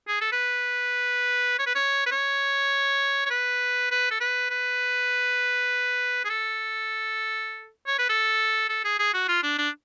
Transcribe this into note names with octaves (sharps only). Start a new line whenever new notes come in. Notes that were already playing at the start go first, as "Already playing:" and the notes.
G#4
A4
B4
C#5
B4
C#5
B4
C#5
C#5
B4
B4
A4
B4
B4
G#4
A4
C#5
B4
A4
A4
G#4
G#4
F#4
F4
D4
D4